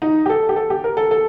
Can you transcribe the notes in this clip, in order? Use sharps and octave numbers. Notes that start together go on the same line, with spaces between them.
D#4
G4
A4
G4
A4
G4
A#4
A4
A4